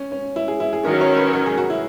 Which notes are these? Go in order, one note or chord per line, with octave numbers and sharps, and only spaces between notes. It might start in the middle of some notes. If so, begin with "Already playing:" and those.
Already playing: C#4
C#4
E4
G#4
E4
G#4
D#3 F#3 C#4 A#4
C#5
B4
A#4
G#4
F#4
E4